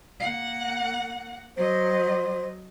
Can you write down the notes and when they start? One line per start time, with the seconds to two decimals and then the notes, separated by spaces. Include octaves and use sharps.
0.20 A#3 F#5
1.57 F#3 C5 D#5